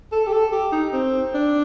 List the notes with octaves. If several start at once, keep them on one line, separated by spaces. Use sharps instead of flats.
A4
G4
A4
G4
D#4
C4
D4